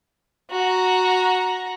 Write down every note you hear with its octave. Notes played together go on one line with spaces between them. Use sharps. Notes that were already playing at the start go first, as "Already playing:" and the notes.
F#4 A#5